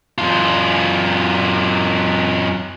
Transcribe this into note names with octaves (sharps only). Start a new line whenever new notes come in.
F#2 F4